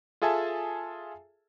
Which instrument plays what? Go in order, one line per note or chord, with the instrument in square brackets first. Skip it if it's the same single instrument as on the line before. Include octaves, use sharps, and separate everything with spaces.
[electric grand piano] F4 G#4 A4 E5 G#5 A5